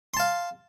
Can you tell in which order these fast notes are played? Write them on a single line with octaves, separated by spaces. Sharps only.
C6 A5 F5